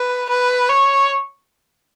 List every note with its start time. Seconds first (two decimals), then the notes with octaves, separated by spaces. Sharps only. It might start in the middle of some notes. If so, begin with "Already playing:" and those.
Already playing: B4
0.29 B4
0.69 C#5